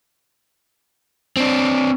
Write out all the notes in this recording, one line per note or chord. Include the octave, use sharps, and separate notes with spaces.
C4 D4